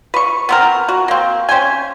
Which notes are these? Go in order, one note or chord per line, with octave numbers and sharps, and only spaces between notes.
B4 C#6
B3 C4 A#4
F#4
A#3 C4
C#4 C5 G5 G#5